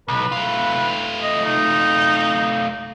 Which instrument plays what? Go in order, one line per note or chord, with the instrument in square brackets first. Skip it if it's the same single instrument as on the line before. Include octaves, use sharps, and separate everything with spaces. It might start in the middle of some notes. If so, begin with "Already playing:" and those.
[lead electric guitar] B1 [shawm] B4
[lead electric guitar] A3 F4
[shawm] D#5
D#4